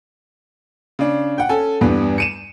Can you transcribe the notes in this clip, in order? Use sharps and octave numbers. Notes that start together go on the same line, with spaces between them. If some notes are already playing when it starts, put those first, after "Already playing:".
C#3 D4
F#5 G5
C#4 A4 G#5
E2 G2 G3 B3
C#7 D#7 E7